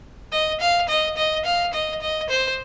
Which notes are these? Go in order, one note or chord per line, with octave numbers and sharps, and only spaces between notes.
D#5
F5
D#5
D#5
F5
D#5
D#5
C5